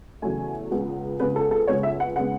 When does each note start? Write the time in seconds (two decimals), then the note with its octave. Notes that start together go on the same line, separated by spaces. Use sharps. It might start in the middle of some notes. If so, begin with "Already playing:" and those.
0.22 E2 C#3 F#3 A3 G#5
0.71 C#2 C#3 G#3 B3
1.20 C#2 C#3 G#3 B3 B4
1.36 A4
1.51 A4
1.68 C#2 C#3 G#3 B3 C#5
1.83 E5
2.00 F#5
2.16 C#3 G#3 B3 F#5